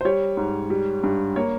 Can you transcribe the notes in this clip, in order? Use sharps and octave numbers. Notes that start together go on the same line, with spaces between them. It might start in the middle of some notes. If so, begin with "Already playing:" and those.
C5
G3 C#5
G#2
G3
G2
A#3 C#5